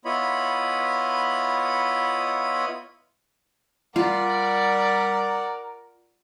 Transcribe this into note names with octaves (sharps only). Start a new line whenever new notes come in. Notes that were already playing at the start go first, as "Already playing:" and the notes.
B3 E4 F4 C#5 D#5 B5
G3 F4 A#4 D5 F#5